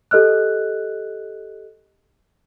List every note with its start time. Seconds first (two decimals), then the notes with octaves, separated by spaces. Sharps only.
0.11 G4 A4 D#5 F6 F#6